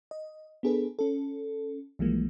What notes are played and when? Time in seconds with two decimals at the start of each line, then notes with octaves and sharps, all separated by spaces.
0.11 D#5
0.63 B3 D4 G#4 A4 B4
0.99 C#4 A4
1.99 B1 E3 F3 G3 G#3 A#3